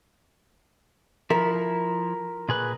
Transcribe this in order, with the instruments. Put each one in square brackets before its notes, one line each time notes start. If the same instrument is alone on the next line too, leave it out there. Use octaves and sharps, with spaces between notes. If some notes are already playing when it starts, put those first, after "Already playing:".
[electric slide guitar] F3 E4 [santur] A#4
[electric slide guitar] A#2 G#4 B4